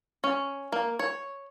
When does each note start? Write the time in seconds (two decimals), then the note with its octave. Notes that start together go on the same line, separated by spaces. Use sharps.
0.24 C#4
0.72 A#3
0.99 C#5